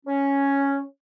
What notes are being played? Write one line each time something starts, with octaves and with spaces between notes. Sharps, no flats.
C#4